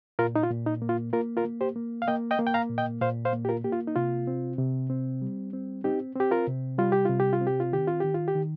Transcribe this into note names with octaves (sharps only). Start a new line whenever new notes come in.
A#2 F4 A#4
D#4
F4
A#2
D#4
A#3
F4
A#3 F4 A#4
F4 A#4
A#3
G4 C5
A#3
F5
A#3 D#5 G5
D#5 G5
A#3
G5
F5 A#5
A#2
D#5 G5
A#2 C5 F5
C5 F5
A#3
G4
F4 A#4
A#3 G4
F4
D#4
C3 F4
C4
C3
C4
G3
C4
C4 D#4 G4
C4 G4
F4 A#4
C3
G3 F4
G4
C3 F4
G4
F4
C4
G4
F4
D#3 G4
F4
D#3 G4
F4
G4
D#3